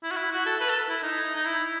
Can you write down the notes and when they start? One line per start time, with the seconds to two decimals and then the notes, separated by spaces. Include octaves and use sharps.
0.03 E4
0.11 F#4
0.17 E4
0.32 F#4
0.46 A4
0.60 B4
0.69 A4
0.88 E4
1.03 D#4
1.35 D#4
1.45 E4